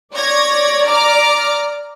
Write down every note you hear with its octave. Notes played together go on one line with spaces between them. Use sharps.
C#5 D5 G#6 A#6
A#5 D6 F6